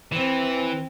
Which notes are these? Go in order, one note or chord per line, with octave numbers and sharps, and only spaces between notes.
E3 C4